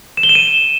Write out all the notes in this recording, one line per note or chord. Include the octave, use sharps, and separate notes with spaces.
E7
G7
E7
D#7